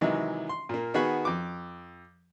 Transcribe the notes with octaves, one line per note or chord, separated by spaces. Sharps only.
C3 D#3 E3 F#3 G#3
C6
A#2 A#3
D#3 B3 F#4 G#4 B5
F2 D6